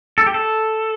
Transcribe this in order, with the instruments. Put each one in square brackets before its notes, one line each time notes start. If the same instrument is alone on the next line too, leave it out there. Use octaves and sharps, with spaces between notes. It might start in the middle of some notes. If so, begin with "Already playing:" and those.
[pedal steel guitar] A4
G4
A4